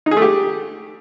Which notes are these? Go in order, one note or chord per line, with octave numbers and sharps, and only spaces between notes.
D#4
G#4
A3
G4